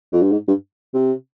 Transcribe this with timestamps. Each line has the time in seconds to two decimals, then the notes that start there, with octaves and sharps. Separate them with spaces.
0.12 F2
0.22 G2
0.32 G#2
0.48 G2
0.94 C3